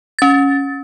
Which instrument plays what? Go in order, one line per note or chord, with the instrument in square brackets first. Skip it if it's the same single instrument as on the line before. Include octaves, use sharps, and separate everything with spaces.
[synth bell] C#4 A6